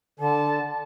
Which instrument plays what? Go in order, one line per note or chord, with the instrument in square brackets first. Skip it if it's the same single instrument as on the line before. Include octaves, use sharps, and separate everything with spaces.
[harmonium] D3 [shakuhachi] A5